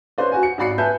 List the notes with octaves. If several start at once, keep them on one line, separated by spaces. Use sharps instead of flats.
C#4 B4 C5 D5
F#4 G#5
C#7
G#1 F#4 D5 B5 C7 C#7
B4 E5 G#5 A5 G6